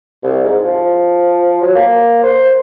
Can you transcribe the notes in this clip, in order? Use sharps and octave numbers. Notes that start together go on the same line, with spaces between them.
C2
G#2
F3
F#3
A#3
C5